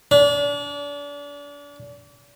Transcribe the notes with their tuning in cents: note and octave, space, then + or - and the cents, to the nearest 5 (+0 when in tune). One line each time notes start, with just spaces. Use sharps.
D4 -35